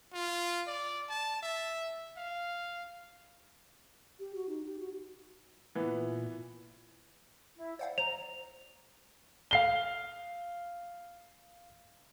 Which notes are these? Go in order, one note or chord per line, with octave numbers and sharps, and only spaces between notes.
F4
D5
A5
E5
F5
G4
F#4
D#4
G4
F#4
A#2 E3 B3
E4
C5 D5 F5 F#5
C5 A#5 F7
F5 C7 G7